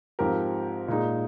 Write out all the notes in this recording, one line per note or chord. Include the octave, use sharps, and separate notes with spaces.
G#2 F3 C4 G4 A#4
A#2 G#3 D#4 G#4